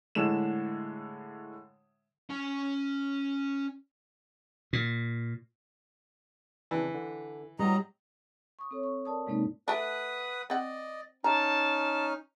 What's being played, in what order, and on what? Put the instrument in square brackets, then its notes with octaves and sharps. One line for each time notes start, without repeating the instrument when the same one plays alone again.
[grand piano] A2 D3 G#3 E7
[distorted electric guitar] C#4 G#5
[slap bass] A#2
[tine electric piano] C#3 C4 D4 [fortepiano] E3
[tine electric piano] D3
[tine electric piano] A2 B3 [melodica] F#3 D#5 A#5 [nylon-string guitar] G3
[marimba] C#6 D#6
C4 A4 C#5
C#6
A#4 D5 A5 D#6
G#2 C3 G#3 A#3 C4 D#4
[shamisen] A3 D4 [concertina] B4 F#5 D#6
[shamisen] C4 F#5 [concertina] D5 D#5
[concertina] C#4 D#4 F6 [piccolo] A5 [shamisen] A#5